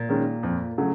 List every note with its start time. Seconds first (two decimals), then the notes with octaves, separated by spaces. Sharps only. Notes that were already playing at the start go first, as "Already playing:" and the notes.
Already playing: A#2
0.09 D#3 G#3 C#4
0.43 F2
0.78 C#3 F#3 A3